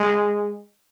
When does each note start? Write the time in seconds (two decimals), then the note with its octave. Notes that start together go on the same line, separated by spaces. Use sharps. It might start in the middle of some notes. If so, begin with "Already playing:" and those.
Already playing: G#3